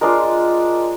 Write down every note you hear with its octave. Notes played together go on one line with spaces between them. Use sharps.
G#3 D4 F4 A#4